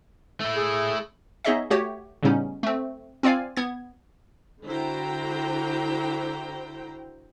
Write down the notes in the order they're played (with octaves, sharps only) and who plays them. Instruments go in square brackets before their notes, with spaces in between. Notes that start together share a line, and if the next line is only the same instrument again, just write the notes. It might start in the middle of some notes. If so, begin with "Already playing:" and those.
[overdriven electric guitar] A3 E4
[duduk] G#4
[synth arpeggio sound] B3 D#4 G#4 C#5 D#5 E5
A3 F#4 G4 C#5
A2 C#3 G3 B3 C#4 D#4
A3 C4
C4 F4 D5 F5 G#5
B3 G#6
[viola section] D3 E4 F#4 C5 G5 A#5